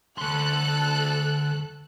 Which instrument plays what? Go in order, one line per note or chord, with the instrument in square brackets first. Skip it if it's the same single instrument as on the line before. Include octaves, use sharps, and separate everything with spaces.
[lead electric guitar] D2 C6 [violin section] A4 F#6